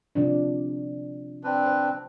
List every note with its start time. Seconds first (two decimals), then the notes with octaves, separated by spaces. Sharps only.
0.15 C3 F3 D4
1.44 C4 D4 B4
1.65 C5